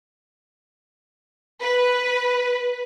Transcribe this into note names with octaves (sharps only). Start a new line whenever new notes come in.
B4